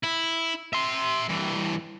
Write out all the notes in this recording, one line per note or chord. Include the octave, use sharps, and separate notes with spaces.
E4
E5 C6
G2 E3